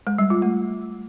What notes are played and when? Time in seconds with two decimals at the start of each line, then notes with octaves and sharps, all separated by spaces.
0.07 G#3
0.18 G3
0.30 F4
0.42 A3